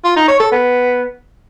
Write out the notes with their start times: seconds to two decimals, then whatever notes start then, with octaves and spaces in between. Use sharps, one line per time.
0.05 F4
0.16 D#4
0.28 C#5
0.40 A4
0.52 B3